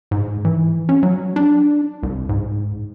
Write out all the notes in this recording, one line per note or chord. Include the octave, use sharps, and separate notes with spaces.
G#2
E3
C#4
F#3
D4
C2
G#2